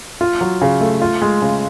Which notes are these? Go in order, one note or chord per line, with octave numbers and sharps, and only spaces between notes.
F4
F#3
C#3
A3
F4
G#3
C#3